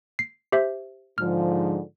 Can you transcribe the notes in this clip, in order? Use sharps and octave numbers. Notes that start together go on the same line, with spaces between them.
C7
G4 C5 E5
G#2 D3 F3 F6